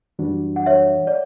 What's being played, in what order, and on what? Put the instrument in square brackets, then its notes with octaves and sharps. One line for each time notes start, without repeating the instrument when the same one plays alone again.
[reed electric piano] F#2 E3 G3 D4 F#4
[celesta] F#5
C#5 E5
D5